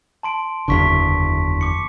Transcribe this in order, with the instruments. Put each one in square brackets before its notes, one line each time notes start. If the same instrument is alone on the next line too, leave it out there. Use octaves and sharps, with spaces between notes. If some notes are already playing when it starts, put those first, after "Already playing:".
[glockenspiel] A5 C6 D7
[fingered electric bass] F#1 E2 D3 [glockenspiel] A5 C#6 B6
[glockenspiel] D6 C#7